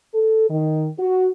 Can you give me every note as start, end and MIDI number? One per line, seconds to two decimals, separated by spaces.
0.14 0.49 69
0.50 0.88 51
0.99 1.29 66